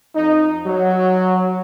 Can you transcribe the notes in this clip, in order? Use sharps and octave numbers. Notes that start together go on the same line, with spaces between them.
F2 D#4
F#3